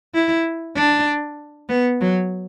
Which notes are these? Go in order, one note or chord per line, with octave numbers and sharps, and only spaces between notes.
E4
D4
B3
F#3